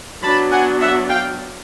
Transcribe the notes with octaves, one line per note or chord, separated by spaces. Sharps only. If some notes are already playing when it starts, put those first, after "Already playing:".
F#3 B3 D4 A5 B5
F#5 G#5
E5 F#5
F5 G5